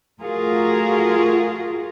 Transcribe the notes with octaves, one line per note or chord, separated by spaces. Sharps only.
A3 F4 F#4 G#4 A#4